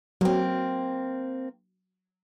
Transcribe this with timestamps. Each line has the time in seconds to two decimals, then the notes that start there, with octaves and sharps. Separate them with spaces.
0.21 F#3 A#3 C4